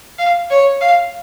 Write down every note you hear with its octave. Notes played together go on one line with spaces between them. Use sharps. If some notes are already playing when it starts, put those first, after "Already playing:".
F5
C#5
F5